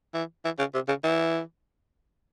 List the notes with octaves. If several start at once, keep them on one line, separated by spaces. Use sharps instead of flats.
E3
E3
C#3
C3
C#3
E3